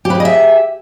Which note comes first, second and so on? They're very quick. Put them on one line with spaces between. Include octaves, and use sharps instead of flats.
G4 B4 G#4 D#5 E5